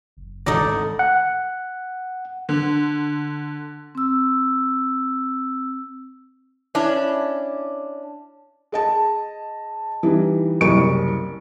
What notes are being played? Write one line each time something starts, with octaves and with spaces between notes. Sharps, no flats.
F#1
G#1 D2 A2 A3 D#4 A4 D5 A#6
F#5
D3
C4 E6
C#4 D4 E4
G#4 D#5 A5
E3 G3 D#4
F#1 C2 C#6 C#7 D7